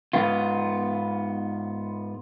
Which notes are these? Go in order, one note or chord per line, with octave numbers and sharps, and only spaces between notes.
G#2 B3 F4